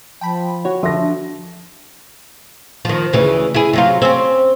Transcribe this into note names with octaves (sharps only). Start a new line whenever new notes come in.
F3 G5 A5 B5
F#4 C#5
D3 F3 E5 A#6
D4
D#3 F3
D2 C#3 E3
E4 G#4
C3 F#3 F4
C4 C#4